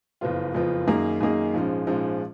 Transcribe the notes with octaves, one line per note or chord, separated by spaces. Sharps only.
F#1 F2 F3 B3 F4
F#1 F2 F3 B3 F4
F#2 D#3 A#3 D#4 G#4
F#2 D#3 A#3 D#4 G#4
A#1 G#2 F3 G#3 C#4
A#1 G#2 F3 G#3 C#4